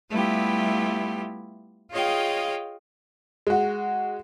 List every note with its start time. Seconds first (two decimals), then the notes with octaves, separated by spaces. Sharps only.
0.10 G3 A3 B3 E4 F4 G4
1.91 F4 G#4 C#5 D#5 F5 G5
3.47 G#3 F#4